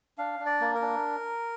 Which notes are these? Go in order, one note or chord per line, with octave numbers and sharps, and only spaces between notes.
D4 F5
D4
D5
A#3
A#4
D4